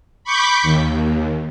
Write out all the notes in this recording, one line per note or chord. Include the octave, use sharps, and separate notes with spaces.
B5 C#6 D6 G6 B6
D#2